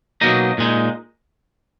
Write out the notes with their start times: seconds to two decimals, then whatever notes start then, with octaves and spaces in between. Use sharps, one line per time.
0.21 B2 F#3 A#3 D#4 D#5
0.58 A#2 G#3 D#4